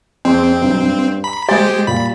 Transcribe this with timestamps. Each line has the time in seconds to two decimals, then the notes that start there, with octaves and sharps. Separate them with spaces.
0.25 F2 C4 G#4 C6
0.62 B1 G2
0.81 G2
1.24 A#5 B5
1.49 G#3 G4 C5 G#5 A6
1.87 A#2 G3 B5